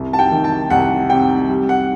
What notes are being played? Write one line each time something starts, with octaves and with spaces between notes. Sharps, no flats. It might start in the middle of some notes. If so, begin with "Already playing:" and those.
Already playing: C2
A5
G5
D#3
A5
C2 F#5
C3 G5
G3
F#5